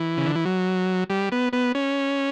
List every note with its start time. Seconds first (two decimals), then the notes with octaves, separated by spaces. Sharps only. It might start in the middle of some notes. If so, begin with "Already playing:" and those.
Already playing: E3
0.17 C#3
0.26 D3
0.36 E3
0.45 F#3
1.10 G3
1.32 B3
1.53 B3
1.75 C#4